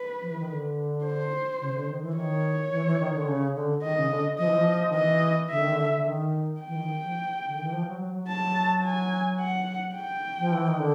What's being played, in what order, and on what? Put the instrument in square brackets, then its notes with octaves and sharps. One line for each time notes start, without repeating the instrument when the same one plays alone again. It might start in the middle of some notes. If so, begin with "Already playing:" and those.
Already playing: [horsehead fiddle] B4
[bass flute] F3
E3
D#3
D3
[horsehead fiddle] C5
[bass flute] C#3
D3
D#3
E3
[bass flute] D#3 [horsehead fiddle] C#5
[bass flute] E3
E3
D#3
D3
C#3
D3
[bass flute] D#3 [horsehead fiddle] D#5
[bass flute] C#3
D3
[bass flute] F3 [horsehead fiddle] D#5
[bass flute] E3
F3
D#3
[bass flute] E3 [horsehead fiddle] D#5
[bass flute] D3 [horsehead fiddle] E5
[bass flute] D#3
D3
D3
D#3
[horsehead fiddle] G5
[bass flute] E3
D#3
F3
D3
D#3
E3
F3
F#3
F#3
F#3
[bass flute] F#3 [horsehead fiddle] A5
[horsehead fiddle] G#5
F#5
G5
[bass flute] F3
E3
D#3
D3